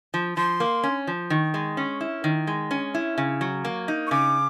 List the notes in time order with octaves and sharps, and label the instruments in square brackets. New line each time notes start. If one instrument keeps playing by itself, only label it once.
[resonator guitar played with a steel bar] F3
[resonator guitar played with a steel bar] F3 [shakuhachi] C6
[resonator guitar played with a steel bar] A#3
C#4
F3
D#3
G#3
C#4
E4
D#3
G#3
C#4
E4
C#3
F#3
A#3
D#4
[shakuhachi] C#6
[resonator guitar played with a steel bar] C#3 [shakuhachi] D6